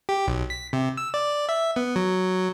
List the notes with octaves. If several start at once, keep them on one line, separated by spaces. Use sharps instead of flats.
G4
B1
B6
C3
E6
D5
E5
B3
F#3